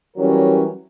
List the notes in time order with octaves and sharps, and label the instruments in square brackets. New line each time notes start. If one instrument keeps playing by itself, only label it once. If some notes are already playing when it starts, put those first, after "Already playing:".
[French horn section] E3 F#3 G3 C#4 A#4